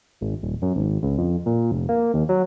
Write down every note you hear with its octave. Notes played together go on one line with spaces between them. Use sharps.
G#1
D#1
F#2
G#1
C#2
F2
A#2
F1
A#3
D#2
F#3